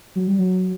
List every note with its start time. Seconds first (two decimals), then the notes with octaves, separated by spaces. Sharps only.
0.15 F#3
0.27 G3
0.39 F#3